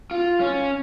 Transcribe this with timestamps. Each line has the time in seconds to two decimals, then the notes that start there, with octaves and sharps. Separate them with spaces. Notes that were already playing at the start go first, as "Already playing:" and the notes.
0.11 F4
0.40 C#4